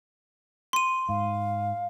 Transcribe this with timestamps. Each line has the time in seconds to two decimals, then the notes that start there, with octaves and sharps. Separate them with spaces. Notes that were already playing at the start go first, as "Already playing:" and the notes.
0.73 C6 D#7
1.09 G#2 F5